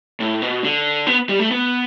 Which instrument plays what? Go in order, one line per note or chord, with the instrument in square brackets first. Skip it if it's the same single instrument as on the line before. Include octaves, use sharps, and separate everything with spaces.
[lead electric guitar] A2
B2
D3
B3
G3
A3
B3